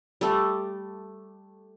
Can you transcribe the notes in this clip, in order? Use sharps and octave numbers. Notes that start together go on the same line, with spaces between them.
G3 A3